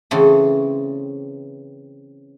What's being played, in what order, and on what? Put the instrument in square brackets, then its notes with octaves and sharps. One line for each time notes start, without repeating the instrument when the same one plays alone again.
[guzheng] C#3 E3 A3 C4